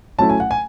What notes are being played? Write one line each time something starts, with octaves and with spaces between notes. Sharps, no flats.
F#3 A3 C#4 E4 A5
G#5
F#5
G#5